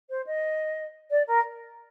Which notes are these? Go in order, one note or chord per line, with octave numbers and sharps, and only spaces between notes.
C5
D#5
D5
A#4